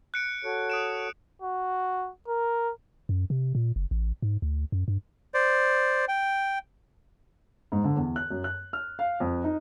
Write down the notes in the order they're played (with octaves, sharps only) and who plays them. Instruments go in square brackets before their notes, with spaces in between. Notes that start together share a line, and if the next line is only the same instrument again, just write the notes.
[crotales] F#6 C#7 D7
[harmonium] F#4 A4 C#5
[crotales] D#6 D7 E7
[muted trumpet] F#4
A#4
[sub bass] F#2
C3
A#2
F#1
A1
G#2
D2
F#2
G2
[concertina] C5 D5
G5
[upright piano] G#2
D3
E2
F#6
F#2
F#6
F6
F5
F2
D#4